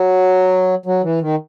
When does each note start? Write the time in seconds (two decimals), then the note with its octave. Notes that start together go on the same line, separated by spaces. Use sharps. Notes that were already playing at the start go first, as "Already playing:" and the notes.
Already playing: F#3
0.86 F#3
1.03 E3
1.21 D#3